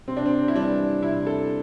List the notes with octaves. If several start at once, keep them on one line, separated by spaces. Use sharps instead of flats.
C3 C4
D4
C4
E4
E3 G3 D4
C3 E4
A4